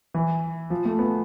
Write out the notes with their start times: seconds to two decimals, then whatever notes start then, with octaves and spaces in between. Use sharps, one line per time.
0.14 E3
0.70 F3
0.85 A3
0.99 B3